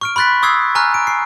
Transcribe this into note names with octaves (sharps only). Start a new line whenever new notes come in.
C#6 F6 D7
B5 C6 F#6 A6 B6
C#6 D#6 E6 G#6 C7
G#5 A#5 C#6 F6 F#6
D7
C7